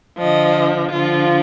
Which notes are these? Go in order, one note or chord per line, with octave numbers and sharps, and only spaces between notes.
D3 F3 D#5
D3 F3 F4